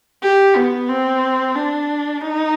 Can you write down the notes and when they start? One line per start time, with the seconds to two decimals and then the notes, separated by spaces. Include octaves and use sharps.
0.23 G4
0.56 B3
0.89 C4
1.56 D4
2.22 D#4